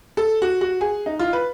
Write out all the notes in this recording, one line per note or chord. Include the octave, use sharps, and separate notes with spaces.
A4
F#4
F#4
G#4
D#4
F4
B4